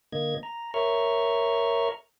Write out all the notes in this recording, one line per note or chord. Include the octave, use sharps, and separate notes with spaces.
D3 A#3 D#5 G#6
A#5
A#4 C#5 E5 A#5 C#6 F6